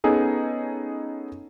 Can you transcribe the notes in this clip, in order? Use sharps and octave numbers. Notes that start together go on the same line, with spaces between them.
B3 C#4 D#4 G#4 A4